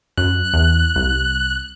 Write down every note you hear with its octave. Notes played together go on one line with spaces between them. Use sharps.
F#2 F#6
E2
C2